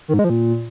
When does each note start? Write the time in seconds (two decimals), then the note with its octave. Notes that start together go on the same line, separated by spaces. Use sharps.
0.08 D#3
0.14 G#2
0.19 G#3
0.24 F3
0.30 A#2